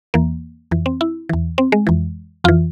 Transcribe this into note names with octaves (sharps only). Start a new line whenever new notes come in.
E2 E3 A#3
F2 E3
C4
E4
E2 E3
C4
G#3
F2 E3
F2 E3 F4